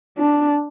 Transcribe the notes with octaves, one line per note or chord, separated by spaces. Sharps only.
D4